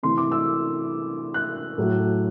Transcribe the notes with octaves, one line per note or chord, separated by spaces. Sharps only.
C3 E3 A3 C6
D6
E6
F#6
A2 F#3 A3